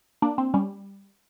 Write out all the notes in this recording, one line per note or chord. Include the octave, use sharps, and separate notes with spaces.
A#3 D4
C4
G3 C#4